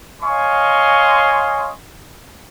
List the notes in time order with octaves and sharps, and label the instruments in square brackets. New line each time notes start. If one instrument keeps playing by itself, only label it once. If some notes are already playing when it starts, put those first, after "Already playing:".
[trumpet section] C#5 D#5 F5 G#5 C6 C#6